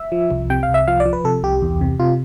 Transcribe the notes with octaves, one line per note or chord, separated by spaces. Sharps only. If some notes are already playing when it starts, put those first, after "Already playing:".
Already playing: E5
F3
C2
C3 G5
F5
C2
E5
F3 F5
D5
F3
B4
C3 A4
C2 G4
E2
C3
C3 F4